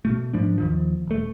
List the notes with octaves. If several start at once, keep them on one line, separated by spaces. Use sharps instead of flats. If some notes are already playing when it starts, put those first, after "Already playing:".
B2 A3
G#2 F3 D4
D#2 D#3 F3
D#1 A3